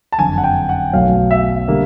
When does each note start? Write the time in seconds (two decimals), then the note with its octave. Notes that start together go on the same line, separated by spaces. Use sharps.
0.12 A5
0.18 F#1 F2 D3 G#5
0.38 F#5
0.44 G5
0.69 F#5
0.93 B1 B2 F#3 A3 F5
1.31 E5
1.68 D3 G3 A#3